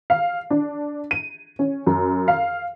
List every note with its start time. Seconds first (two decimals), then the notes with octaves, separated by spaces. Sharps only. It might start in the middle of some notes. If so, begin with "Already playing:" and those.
0.10 F5
0.50 D4
1.11 D#7
1.59 C#4
1.87 F#2
2.28 F5